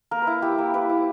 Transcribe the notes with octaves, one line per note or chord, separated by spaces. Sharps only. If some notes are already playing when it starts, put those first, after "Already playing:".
A#3 A#4
B4
E4
E4 G4
A#3
E4 B4
E4